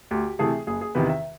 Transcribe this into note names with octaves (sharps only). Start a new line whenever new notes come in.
D2 G4
C3 E3 A3 G#4
F#1 G#4
G#4
E2 C3 D#3 B4
E5